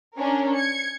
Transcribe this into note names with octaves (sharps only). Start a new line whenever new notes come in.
C#4 D4 A#4
G#6 C#7